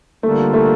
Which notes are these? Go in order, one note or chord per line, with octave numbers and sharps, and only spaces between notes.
D3 G3 A3 A#3 F4 A4
A3